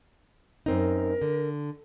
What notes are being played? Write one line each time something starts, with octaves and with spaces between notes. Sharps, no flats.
F#2 C4 D#4 A#4
D3